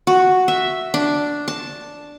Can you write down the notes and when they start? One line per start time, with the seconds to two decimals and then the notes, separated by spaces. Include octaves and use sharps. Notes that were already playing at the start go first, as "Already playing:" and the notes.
0.07 F#4
0.48 E5
0.94 D4
1.48 A5